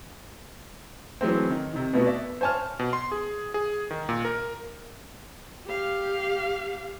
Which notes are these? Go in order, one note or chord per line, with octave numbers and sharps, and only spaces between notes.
E3 F#3 G#3 A3 C4
D#3
C3 D#3
B2 A3 B3 F#4
D5 E5
C5 C#5 G#5 A5 F6
B2
C6
G#4
G#4
D#3
A#2
A#4
G4 F5